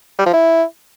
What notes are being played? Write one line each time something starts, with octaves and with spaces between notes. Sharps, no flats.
G3
F3
E4